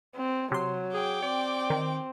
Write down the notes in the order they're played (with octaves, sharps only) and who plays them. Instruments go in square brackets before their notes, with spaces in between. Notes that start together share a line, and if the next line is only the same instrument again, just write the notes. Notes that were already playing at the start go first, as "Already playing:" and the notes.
[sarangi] C4
[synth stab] C3 C6 [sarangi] F#3
[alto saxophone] G#4 [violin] G5 D6
[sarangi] C4 [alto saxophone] D5
[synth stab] D#3